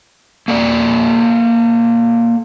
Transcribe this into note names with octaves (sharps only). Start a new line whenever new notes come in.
A#3 A4 D5